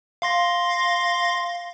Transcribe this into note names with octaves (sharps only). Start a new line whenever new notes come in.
F5 C6 A#6